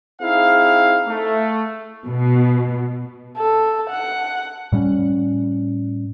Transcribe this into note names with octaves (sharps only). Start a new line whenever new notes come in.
C4 D#4 E4 G#4 F5
A3
B2
A4
F#5
A2 G3 A3 C#4